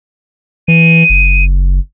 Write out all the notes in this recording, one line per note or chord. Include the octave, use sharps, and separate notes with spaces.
E3 D#7
F#1